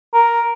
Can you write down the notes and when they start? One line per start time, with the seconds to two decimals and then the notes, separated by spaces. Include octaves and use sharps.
0.14 A#4